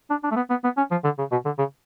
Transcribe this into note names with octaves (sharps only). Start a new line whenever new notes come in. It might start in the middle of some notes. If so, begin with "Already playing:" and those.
D4
D4
A3
B3
B3
B3
C#4
F3
D3
C#3
B2
D3
C#3